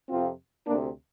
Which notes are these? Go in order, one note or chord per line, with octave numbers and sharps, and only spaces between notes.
F2 C3 C4 F4
D2 C3 A#3 D4